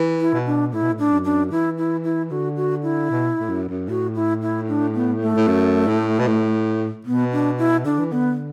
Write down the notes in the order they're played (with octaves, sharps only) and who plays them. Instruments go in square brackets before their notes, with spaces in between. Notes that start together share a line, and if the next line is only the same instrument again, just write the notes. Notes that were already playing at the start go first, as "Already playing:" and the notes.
Already playing: [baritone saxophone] E3
[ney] E4
[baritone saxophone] B2
[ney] D4
[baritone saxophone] A2 [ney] E4
[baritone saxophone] B2
A2
[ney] D4
[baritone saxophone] F#2
[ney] D4
[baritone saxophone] E3 [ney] E4
[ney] E4
E4
[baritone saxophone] D3 [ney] F#4
[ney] F#4
E4
[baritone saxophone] B2
A2
F#2
F#2
[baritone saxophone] A2 [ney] F#4
[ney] E4
E4
D4
B3
A3
[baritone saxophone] A2
F#2
A2
B2
A2
[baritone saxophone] B2 [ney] B3
[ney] D4
E4
[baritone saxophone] D3 [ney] D4
[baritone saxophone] E3
[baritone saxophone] D3 [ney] B3